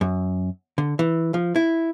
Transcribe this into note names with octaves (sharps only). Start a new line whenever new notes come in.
F#2
D3
E3
F3
E4